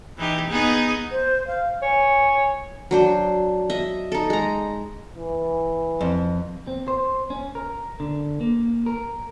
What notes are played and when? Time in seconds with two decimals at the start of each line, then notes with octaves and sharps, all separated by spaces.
0.18 E3 D#4 G4
0.49 B3 D#4 G#4
1.11 C5
1.47 F5
1.82 C#5 G#5
2.91 F#3 D4 C5
3.70 D#5 E5
4.12 D#4 A4
4.30 G#3 A#5
5.16 E3
6.01 F2
6.67 C4
6.88 C5
7.30 C#4
7.55 A#4
8.00 D3
8.41 A#3
8.86 A#4